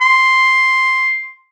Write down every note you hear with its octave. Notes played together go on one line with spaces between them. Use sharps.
C6